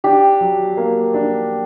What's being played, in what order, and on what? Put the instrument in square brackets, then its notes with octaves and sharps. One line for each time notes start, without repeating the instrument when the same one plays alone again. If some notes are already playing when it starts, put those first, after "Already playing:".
[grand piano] D4 [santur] G4
[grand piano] F#3
A#3
D4